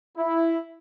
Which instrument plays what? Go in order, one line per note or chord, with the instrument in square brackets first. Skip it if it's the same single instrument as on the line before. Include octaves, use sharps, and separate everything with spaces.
[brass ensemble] E4